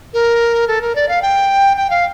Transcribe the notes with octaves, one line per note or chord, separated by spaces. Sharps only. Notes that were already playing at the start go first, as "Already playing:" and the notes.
A#4
A4
A#4
D5
F5
G5
G5
F5